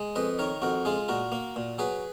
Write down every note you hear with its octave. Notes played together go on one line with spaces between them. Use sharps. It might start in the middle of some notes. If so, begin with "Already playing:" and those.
Already playing: G#3
F2 B4 D#5
D#3 A#4 C#5
F2 F#4 A#4
G#3 F4 G#4
A#2 F#4 A#4
A#3
A#2
F#3 G#4 B4